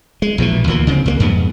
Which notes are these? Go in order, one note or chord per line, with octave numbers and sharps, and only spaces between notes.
G#3
A#1 B2 D#3 E3
D2 E3 F3 A#3
C#3 B3 C4
C#2 G3 A#3
F2 G#2 G#3 B3